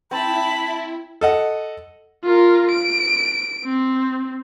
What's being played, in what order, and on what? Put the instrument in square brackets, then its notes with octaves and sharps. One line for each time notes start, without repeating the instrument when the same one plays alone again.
[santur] C4 [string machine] E4 [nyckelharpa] A5 [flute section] B5
[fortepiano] A4 D#5 F#5
[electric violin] F4 A#4
D7
C4